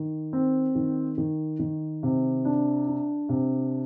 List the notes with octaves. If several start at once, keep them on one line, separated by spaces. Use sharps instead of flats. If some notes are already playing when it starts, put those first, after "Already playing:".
Already playing: D#3
C4
D#3
D#3
D#3
C3
D4
D4
C3